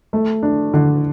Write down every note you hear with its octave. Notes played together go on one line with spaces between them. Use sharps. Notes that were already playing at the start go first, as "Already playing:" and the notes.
A3
D4
D3